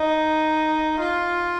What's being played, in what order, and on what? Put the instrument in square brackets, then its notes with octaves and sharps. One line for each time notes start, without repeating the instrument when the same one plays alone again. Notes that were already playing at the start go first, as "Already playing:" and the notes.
Already playing: [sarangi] D#4
F4